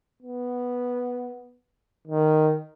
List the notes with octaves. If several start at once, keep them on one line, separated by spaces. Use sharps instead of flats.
B3
D#3